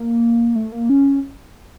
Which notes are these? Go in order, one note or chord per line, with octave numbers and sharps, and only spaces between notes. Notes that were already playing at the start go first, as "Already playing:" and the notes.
Already playing: A#3
A3
A#3
C#4